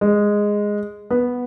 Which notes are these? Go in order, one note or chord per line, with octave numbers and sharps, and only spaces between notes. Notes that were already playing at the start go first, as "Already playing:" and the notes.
G#3
B3